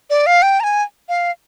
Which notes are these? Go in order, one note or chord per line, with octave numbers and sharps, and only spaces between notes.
D5
F5
G5
A#5
G#5
F5